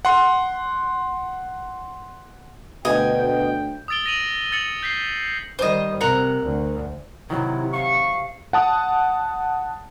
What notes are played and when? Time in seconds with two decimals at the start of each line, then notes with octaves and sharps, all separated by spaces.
0.05 F#5 C6
2.85 D2 B2 D#5 G5 G#5
3.88 D#6 E6 A6 D7 G7
4.06 A#6 D#7 F#7
4.52 E6 A6 C#7 F#7
4.83 G6 B6 C7
5.59 D#3 G3 C5 D#5
6.01 C3 A#4 F#5
6.45 D2
7.30 C3 D#3 F#3 E4
7.73 F5 C#6
8.53 F#5 A5 D#6